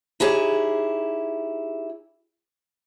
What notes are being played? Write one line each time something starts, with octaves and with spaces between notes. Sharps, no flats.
D#4 E4 G4 G#4 C#5